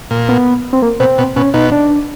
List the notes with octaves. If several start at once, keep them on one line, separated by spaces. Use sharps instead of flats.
A#2
B3
C4
A#3
B2 C4
B2
B2 C#4
B2 D#4
D4